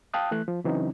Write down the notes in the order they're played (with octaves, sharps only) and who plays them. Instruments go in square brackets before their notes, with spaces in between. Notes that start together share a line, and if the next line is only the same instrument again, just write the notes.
[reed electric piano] F5 G5 A5 D#6 F#6
E3 A3 F#6
F3
C#3 E3 F#3 C4 C#4 D#4